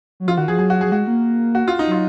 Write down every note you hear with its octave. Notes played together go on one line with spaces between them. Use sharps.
F#3
F3 F4
D#3 F#4
F3 G#4
F#3 G#4
F#4
G#4
F#3
G#3 F#4
A#3
F#4
F4
D#4
F#3 F4